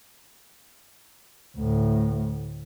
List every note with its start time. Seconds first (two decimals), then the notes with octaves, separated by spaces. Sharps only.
1.57 D2 A2